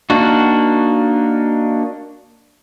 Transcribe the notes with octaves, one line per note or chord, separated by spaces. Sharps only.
A#3 D4 D#4 F#4